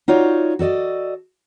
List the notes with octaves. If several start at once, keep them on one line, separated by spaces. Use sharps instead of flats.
D#4 F4 F#4 C#5 D5
F#4 A4 D5 D#5